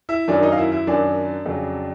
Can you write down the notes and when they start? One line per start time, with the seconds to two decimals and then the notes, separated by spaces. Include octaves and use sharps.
0.09 E4 E5
0.28 F#2 D#3 F#3 D4 D5
0.42 D#4 D#5
0.52 F5
0.58 E4 E5
0.72 E4 E5
0.87 F#2 D#3 F#3 D4 D5
1.46 F2 C#3 F#3